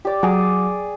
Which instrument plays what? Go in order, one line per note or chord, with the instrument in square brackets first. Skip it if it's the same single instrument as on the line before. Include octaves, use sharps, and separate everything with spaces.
[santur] G4 D5
[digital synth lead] F#3 [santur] G#4 D6